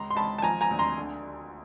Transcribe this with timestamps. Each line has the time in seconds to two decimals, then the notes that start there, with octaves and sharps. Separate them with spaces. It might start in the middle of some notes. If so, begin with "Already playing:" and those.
Already playing: C#2 A#5 C6
0.10 C6
0.16 C#2 A5 B5
0.38 A5
0.42 F3 G#5 A#5
0.61 G#5 A#5
0.70 D2
0.79 A#5 C6
0.97 D3